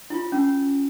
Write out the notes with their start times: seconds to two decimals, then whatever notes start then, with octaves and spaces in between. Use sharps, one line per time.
0.10 E4 F4
0.32 C#4